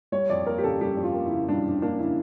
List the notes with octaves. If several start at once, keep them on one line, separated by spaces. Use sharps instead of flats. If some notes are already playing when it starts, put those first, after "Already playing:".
G3 C#5
F2 D5
A#3 A#4
G4
C#3 A4
G3 G4
F2
F4
A#3
E4
C#3
G3 D4
F2
A#3 D4
C#3 E4